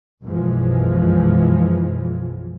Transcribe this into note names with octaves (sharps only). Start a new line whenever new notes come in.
B1 F#2 B2 E3 F3 G#3